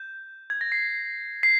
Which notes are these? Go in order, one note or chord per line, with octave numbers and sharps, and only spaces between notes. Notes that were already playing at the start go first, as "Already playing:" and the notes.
Already playing: G6
G#6
A#6
C7
C7